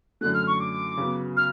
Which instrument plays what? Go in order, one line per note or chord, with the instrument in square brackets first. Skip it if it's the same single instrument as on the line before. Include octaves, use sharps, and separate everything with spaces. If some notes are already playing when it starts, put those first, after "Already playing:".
[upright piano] F#2 D3 F#3 A3 [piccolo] F#6
[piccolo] F6
C#6
D6
[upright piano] C#3 F#3 B3
[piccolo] F6